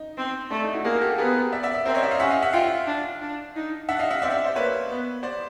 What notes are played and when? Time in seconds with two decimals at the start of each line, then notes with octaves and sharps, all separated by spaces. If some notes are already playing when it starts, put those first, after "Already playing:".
Already playing: D#4
0.17 C4
0.50 A3 D4
0.62 D#4
0.73 E4 F#4
0.84 A#3 F#4 G#4
1.02 G4 A4
1.18 B3 G#4 A#4
1.53 D5 E5
1.63 D5 E5
1.75 D5 E5
1.85 C4 A#4 C5
1.94 C#5 D#5
2.03 D5 E5
2.11 D#5 F5
2.20 C#4 E5 F#5
2.31 D#5 F5
2.42 E5 F#5
2.53 F4 F5 G5
2.87 D4
3.21 D4
3.55 D#4
3.88 D4 E5 F#5
3.99 D#5 F5
4.11 E5 F#5
4.22 C4 D5 E5
4.44 C5 D5
4.55 A#3 B4 C#5
4.90 B3
5.23 C5 D5